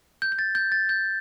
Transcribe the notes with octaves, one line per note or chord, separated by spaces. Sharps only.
G6
G6
A6
G6
A6
G6